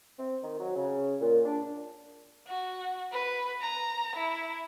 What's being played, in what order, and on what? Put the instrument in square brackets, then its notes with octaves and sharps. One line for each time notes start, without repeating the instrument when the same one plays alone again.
[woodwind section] C4
D#3
F#3
C#3
A#2
D4
[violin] F#4
B4
A#5
E4